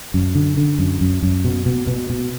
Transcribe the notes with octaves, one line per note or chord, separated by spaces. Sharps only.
F#2
D3
D3
F#2
F#2
F#2
B2
B2
B2
B2